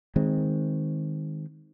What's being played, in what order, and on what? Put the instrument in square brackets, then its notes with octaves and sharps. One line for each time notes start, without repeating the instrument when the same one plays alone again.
[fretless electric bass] D#3 G#3 C4